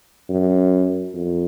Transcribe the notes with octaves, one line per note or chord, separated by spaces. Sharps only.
F#2
F2